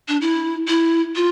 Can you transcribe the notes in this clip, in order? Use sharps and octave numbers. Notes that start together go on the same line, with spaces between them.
D4
E4
E4
F4